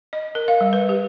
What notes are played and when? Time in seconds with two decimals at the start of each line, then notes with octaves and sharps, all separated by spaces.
0.13 D#5
0.35 A#4
0.48 F5
0.61 G3
0.73 B4
0.89 G4